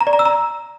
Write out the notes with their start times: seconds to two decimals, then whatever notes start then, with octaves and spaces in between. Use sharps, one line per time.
0.01 A#5
0.07 D5
0.13 A#5
0.19 E6
0.25 A#5